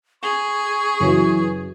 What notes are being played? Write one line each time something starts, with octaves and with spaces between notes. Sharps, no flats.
G#4 C#6
F#2 C#3 E3 F#3